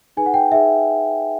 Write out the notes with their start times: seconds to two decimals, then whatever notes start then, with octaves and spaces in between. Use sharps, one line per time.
0.17 D#4 G#4 B4 G#5
0.26 F#5
0.34 G5
0.51 D#4 G#4 E5